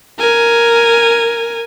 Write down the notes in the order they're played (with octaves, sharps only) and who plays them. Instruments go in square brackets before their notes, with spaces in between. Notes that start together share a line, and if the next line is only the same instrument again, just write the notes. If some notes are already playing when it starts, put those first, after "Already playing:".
[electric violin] A#4 G#5